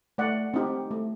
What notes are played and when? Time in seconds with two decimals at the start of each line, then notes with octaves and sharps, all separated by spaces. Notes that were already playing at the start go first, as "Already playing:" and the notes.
0.18 A3 D5 F#5
0.54 C4 D#4 G4
0.91 A3